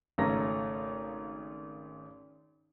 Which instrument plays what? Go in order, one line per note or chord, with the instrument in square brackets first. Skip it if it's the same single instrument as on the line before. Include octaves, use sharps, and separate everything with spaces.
[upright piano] G#1 C#3 A3 C#4 A#5 A#6